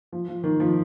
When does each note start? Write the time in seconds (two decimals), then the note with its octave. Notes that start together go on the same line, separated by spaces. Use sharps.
0.13 F3
0.28 F3
0.44 D#3
0.60 F3